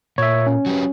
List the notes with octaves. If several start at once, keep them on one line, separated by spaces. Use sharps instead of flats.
A#2 C#5 E5
C#4
F#3 G4 B4